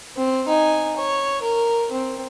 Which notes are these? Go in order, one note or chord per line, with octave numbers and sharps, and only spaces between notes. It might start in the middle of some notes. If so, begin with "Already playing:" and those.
C4
D#4 G#5
C#5
A#4
C4